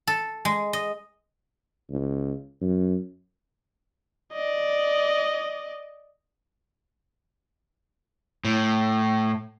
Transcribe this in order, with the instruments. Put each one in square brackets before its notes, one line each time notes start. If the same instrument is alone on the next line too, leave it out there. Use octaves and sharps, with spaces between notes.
[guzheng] A4
G#3
D#5
[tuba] C#2
F#2
[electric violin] D5 D#5
[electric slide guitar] A2